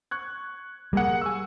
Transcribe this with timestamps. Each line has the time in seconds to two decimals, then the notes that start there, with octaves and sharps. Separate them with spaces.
0.11 C#6 F#6 G#6
0.93 G3 A#3 G#4 F#5
1.21 G#5 C#6 E6